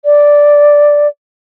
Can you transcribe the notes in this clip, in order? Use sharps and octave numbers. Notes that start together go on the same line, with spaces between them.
D5